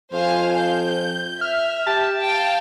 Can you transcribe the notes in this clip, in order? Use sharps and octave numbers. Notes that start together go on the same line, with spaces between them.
F2 C5 F5 G#5
G6
E5 F6
G4 A5
F5 G5